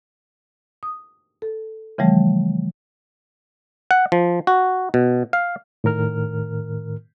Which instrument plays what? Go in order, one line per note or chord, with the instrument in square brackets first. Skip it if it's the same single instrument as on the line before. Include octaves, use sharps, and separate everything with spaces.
[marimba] D#6
A4
C#3 E3 F3 G3 A3
[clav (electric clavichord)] F#5
F3
F#4
B2
F5
[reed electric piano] A2 D#3 A#4 F6